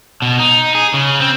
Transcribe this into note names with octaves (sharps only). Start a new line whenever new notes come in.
B2
D#4
G#4
C#3
C4